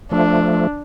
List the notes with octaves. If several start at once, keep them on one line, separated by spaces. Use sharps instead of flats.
F3 A3 D4